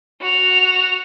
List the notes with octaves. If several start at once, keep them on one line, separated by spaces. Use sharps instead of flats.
F#4 F7